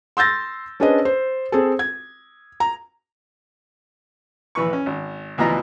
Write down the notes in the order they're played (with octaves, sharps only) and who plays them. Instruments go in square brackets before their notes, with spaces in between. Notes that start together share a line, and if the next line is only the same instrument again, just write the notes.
[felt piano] C6 E6 G6 A6 A#6
C#4 D4 G#4 B4 C5 D#5
C5
C4 G#4 A4
G#6
A#5
[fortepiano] A#1 E3 B4 C#6
C#4
G#1
D2 B2 E3 F3 D#5 A#5